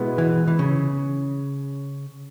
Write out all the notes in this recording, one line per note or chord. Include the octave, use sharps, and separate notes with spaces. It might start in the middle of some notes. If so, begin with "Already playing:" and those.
Already playing: B2 G#3 B3 E4
E3
E3
C#3